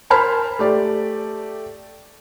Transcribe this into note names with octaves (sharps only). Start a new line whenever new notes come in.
A#4 C5 G#5 A5 B5 F6
A3 G4 D5